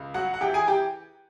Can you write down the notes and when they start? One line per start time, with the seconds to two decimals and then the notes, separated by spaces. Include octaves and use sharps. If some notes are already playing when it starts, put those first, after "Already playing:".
Already playing: C#2
0.14 F#3 F#4 F#5
0.34 F#5
0.41 E3 G4 G5
0.54 G#4 G#5
0.68 G4 G5